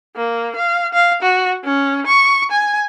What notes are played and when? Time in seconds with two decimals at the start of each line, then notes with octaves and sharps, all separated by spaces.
0.16 A#3
0.56 F5
0.93 F5
1.22 F#4
1.64 C#4
2.06 C#6
2.51 G#5